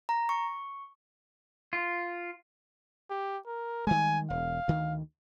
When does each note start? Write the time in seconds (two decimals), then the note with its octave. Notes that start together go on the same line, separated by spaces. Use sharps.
0.09 A#5
0.29 C#6
1.73 F4
3.10 G4
3.46 A#4
3.87 D#3 G3 G#3 G#5
4.30 E1 F5
4.68 D2 D#3